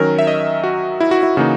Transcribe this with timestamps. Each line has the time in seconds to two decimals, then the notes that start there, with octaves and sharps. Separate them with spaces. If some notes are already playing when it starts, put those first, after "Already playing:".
Already playing: D#3 F#3 C#4 A#4
0.19 E5
0.27 D#5
0.63 F#4
1.00 E4
1.11 F#4
1.23 E4
1.37 C#3 E3 A#3 D#4 F#4